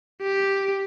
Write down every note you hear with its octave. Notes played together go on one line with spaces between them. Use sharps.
G4